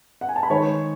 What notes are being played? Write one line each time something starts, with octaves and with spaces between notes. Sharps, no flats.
F#5
G#5
A5
B5
D#3 G#3 C#5 C#6